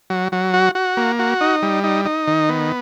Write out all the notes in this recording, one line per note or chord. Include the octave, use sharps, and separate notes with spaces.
F#3
F#3
F#4
F#4
A#3
F#4
D#4
G3
D#4
D#4
D#3
B3